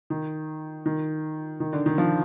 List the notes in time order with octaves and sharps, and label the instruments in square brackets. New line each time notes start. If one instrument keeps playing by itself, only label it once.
[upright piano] D#3
D#3
D#3
D3
D#3
F3